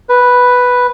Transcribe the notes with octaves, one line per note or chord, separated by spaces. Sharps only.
B4